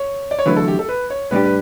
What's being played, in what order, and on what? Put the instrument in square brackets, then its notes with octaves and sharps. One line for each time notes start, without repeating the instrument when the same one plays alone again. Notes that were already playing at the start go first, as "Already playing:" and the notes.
Already playing: [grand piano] C#5
D5
C#5
[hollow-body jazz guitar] E2 D3 F#3 A3 E4 [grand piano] B4
[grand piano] A4
G4
A4
B4
C#5
[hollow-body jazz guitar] A2 G3 D4 G4 [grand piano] B4
[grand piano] B4